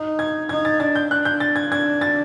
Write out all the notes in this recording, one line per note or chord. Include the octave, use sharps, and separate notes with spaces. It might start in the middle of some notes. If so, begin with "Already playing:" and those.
Already playing: D#4
G#6
D#4 G#6
A6
D4 A6
G6
D4 F#6
G6
A6
G#6
D4 G#6
A6